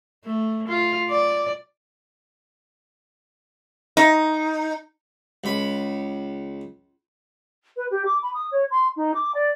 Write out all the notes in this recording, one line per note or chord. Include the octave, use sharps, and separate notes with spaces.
A3
F4
D5
D#4
C#2 B5
B4
G4
D6
B5
D#6
C#5
C6
D#4
D6
D5